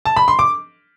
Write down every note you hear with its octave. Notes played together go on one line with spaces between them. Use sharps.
A5
B5
C6
D6